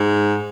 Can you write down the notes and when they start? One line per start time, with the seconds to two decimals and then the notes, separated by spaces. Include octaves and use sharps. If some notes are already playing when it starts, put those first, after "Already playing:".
Already playing: G#2